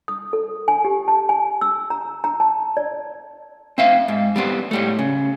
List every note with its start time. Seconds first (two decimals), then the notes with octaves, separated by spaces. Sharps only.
0.08 D#6
0.33 A4
0.68 G#5
0.85 G4
1.08 A5
1.29 G#5
1.61 E6
1.90 A#5
2.24 A#5
2.40 A5
2.77 D5
3.78 C4 E5 F5
4.08 G#2
4.36 G3 B3 C4
4.71 A2 G3 A3
4.99 C#3